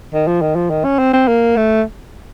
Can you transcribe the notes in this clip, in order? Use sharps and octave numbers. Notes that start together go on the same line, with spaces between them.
D#3
F3
D#3
F3
D#3
C#4
C4
C4
A#3
A3